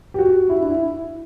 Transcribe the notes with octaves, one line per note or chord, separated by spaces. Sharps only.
G4
F#4
E4
D4
E4